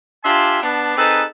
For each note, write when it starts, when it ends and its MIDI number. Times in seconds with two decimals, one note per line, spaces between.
0.24 0.60 62
0.24 0.60 65
0.24 0.60 67
0.24 0.60 76
0.24 0.60 80
0.24 0.60 84
0.62 0.95 59
0.62 0.95 62
0.62 0.95 81
0.97 1.22 60
0.97 1.22 63
0.97 1.22 68
0.97 1.22 69
0.97 1.22 71